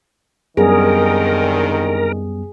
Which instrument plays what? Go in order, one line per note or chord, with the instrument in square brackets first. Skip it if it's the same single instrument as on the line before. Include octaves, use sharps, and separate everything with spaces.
[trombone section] C2 D3 D#3 [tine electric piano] F#2 G3 B3 [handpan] G#4 [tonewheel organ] A#4